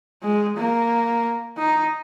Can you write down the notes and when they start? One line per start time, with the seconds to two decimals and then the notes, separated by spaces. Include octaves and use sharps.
0.23 G#3
0.57 A#3
1.58 D#4